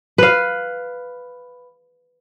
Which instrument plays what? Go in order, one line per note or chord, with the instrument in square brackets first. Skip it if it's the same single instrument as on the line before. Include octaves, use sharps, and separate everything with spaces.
[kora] B4 F5